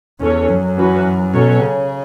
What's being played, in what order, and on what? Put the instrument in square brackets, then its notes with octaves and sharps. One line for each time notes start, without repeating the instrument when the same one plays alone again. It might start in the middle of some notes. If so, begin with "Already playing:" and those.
[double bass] E2 [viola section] C#4 A4 C#5
[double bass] F#2
[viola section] E3 C#4 F#4 B4
[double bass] B2 [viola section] F#3 C#4 A4 C#5
[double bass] C#3